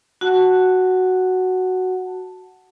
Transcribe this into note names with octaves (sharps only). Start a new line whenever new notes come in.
F#4 F#5 A5